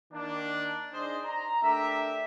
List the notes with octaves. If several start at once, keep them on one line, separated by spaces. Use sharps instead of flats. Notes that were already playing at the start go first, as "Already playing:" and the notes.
D#3 A#3 D4
D4 D#4 G#4 C5 D5 D#5
A#5
A3 D4 G4 A#4 E5